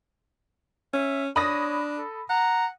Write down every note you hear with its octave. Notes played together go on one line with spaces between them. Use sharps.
C#4 E5
D4 C#5 B5 D#6 A#6
A4
F#5 A#5